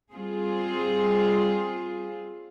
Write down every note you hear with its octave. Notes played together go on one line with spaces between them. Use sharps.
G3 C4 F4 G#4